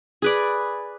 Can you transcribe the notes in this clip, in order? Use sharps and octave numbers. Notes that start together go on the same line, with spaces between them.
G#4 B4 D5